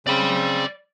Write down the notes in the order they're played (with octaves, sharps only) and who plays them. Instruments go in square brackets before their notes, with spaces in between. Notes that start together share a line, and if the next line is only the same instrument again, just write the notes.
[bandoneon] C#3 C4 [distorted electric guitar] D5 B5